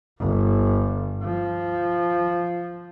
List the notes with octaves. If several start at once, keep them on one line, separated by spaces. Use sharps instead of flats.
G1
F3